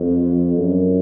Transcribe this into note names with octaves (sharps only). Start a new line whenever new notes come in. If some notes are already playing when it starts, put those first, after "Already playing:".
Already playing: F2
F#2